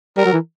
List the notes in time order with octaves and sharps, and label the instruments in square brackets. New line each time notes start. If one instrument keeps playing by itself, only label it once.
[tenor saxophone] G3 [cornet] A#4
[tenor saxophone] F#3
E3